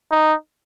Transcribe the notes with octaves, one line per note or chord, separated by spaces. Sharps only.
D#4